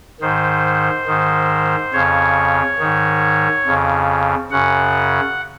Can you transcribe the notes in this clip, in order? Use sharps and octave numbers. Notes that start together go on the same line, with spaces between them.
G#2 D#3 C5
G#2 D#3
F2 C#3 C#5
G#2 D#3
F2 C#3
F#2 C#3 F#5